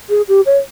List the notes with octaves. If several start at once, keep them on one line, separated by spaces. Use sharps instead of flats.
G#4
G4
C#5